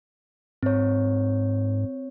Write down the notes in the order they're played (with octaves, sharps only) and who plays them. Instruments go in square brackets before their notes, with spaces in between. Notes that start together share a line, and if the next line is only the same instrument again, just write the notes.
[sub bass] G#2 [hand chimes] C4 C#5